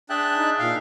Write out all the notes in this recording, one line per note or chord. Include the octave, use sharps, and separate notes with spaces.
D4 G#4 E5 G5 A5 F#6
D#4
A#2 F5